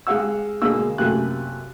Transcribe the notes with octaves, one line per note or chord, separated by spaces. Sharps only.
G#3 G4 G#4 F5 F#5 E6
B2 D3 G#3 A#3 G#4 E6
F#2 C3 A3 A#3 G#5 F#6